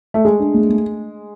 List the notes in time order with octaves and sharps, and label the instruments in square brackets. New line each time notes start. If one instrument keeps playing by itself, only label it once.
[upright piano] A3
[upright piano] G#3 [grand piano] G#4
[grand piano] D4
A3
A3